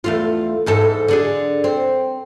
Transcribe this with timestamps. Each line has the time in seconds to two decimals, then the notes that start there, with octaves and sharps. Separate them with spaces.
0.04 E2 A3 F4
0.66 E2 G#2 A4
1.08 D3 D4 G#4
1.64 C4